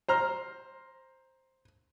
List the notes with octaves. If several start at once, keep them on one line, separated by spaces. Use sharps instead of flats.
C5 A#5 F6